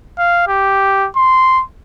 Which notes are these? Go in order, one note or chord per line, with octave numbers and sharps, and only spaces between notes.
F5
G4
C6